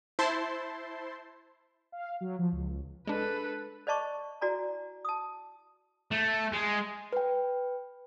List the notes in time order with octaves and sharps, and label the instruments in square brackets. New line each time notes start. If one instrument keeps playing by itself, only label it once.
[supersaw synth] E4 C5 A5 C6
[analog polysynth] F5
F#3
F3
C#2
[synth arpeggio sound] G#3 D4 [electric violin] A4 B4
[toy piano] C5 D5 D#5 A5 C#6 D6
E4 F#4 D5 G#5 A#5
A5 D#6
[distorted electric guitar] A3
G#3
[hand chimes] B4 G5